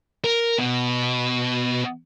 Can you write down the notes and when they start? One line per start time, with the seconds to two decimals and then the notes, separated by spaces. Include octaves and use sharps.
0.24 A#4
0.59 B2